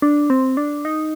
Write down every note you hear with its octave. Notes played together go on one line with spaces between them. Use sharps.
D4
C4
D4
D#4